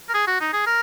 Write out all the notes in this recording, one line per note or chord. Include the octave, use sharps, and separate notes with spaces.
A#4
G#4
F#4
D#4
G#4
A#4